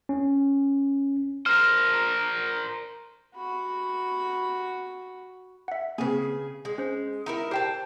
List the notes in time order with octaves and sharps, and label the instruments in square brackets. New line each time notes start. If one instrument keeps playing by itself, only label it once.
[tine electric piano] C#4
[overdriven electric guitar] A#4 C5 [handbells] F6
[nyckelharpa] F#4 B5
[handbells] E5 F#5
[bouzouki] C#3 G#4 [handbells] A#3 C4 B4
[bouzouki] G#3
[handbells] C#4 C5
[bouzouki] D#4 E4 A#4
[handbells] G4 C7 [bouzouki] C5 G5 A5